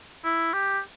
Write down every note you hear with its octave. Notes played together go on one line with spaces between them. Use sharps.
E4
G4